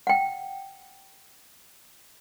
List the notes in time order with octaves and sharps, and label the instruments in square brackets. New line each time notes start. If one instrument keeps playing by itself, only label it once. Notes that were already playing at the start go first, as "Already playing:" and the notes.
[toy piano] F#5 G5